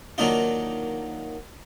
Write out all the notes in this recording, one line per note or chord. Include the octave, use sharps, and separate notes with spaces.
D#3 F#3 A#3 D4 D#4 F4